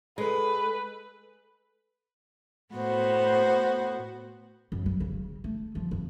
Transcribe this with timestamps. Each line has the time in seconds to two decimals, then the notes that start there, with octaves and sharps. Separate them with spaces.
0.18 G#3 A4 B4
2.74 A2 B3 F#4 C5
4.72 F#2
4.86 F#3
5.00 C#3
5.44 A3
5.75 F3
5.91 F2